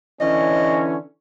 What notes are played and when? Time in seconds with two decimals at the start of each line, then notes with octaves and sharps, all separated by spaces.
0.21 D3 E3 C#4 D#5